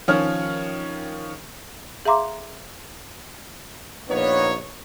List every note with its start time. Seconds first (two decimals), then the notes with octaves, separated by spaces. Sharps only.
0.08 D#3 F3 C#4 C#5 F6
2.06 G#4 E5 F5 A#5 C6 D6
4.10 A#1 A#3 B3 D#4 B4 C#5